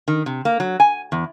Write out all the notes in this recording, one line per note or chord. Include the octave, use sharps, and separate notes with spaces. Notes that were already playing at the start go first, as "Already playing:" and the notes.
D#3
C3
A#3
F#3
G#5
E2